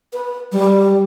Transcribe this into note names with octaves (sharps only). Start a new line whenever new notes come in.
B4
G3